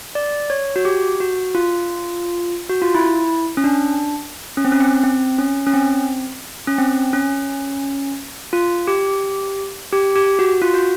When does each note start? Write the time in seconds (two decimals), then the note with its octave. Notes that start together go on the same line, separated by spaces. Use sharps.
0.15 D5
0.50 C#5
0.76 F#4
0.85 G4
1.20 F#4
1.55 F4
2.69 F#4
2.82 F4
2.95 E4
3.57 C#4
3.64 D4
4.57 C#4
4.65 C4
4.72 C#4
4.80 C4
5.04 C4
5.38 C#4
5.67 C#4
5.74 C4
6.67 C#4
6.78 C4
7.13 C#4
8.53 F4
8.87 G4
9.93 G4
10.16 G4
10.39 F#4
10.62 F4
10.74 F#4